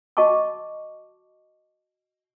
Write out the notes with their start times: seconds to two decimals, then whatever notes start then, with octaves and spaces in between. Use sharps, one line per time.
0.17 F#4 D#5 A5 C#6 D6